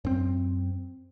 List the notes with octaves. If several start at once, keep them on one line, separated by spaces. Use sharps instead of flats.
F#2 C4